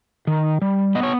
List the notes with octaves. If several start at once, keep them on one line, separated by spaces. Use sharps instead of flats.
D#3
G3
B3 D#5
C#5